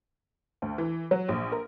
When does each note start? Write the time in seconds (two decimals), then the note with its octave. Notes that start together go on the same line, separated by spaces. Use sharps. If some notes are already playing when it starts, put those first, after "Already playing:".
0.62 D2
0.78 E3
1.11 F#3
1.28 A#1
1.52 A#4